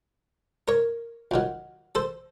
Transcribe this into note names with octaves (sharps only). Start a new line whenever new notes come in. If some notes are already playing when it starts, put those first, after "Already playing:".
A#4 C#5
F2 D#3 F#3
A4 C5